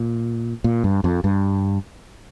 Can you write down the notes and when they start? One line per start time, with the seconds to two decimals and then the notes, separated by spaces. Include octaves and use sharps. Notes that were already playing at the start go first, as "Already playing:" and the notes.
Already playing: A#2
0.64 A#2
0.84 G2
1.04 F2
1.24 G2